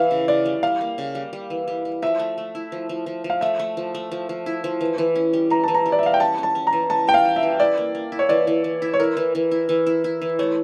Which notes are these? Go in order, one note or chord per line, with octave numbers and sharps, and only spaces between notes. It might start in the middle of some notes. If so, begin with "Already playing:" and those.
Already playing: E3 E5 F5
C#3
C#3 D5
G3
G3 F5
A#3
C#3
G3
G3
E3
G3
G3
F3 E5
A3
A3
E4
F3
F3
F3
F3
F5
A3 E5
A3
F3
A3
F3
F3
E4
F3
E3
E3
C#4
G3
E3 A#5
E3 A5
A#5
G3
D5
E5
G3 F5
G5
C#4 A5
C#4
A5
C#4
A#5
E3
C#4 A5
G3 G5
F5
G3
E5
E3
E4 D5
A#3
A#3
E4
C#5
E3 D5
E3
E3
E4
C#5
E4 A#4
E3
E3
E4
E3
E4
E4
E3
A3 C#5